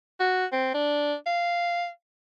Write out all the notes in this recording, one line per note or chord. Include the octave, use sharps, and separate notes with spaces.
F#4
C4
D4
F5